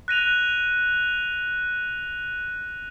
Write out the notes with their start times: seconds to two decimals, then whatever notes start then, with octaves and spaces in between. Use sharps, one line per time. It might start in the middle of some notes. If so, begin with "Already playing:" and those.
0.08 F#6 A#6 D#7 F7